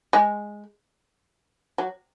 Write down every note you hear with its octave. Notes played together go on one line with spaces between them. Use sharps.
G#3
F#3